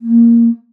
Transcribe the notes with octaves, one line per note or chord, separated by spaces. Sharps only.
A#3